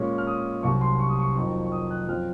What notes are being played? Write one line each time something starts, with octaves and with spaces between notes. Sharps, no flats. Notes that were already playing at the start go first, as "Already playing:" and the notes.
Already playing: A#2 G#3 C#4
F6
D#6
C2 C3 F#3 C#6
C6
C#6
D#6
C#6
F2 D#3 F#3 C4 D#4 C#6
C#6
D#6
F#6
F#2 F3 C4 F6